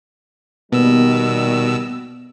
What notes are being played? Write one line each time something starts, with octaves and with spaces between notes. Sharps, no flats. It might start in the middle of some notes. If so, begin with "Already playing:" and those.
B2 D#3 G3 A#3 B3 E6